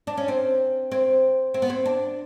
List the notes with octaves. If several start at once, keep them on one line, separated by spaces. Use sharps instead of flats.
D4
C#4
C4
C4
C4
B3
C4
D4